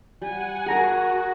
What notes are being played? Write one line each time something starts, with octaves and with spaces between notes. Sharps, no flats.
G3 F#5 G#5
F#4 G#4 A#4 F#5 A#5 A#6